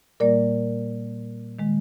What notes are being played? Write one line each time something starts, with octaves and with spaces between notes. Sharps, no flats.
A#2 G3 A#3 A#4 D5
D#3 G#3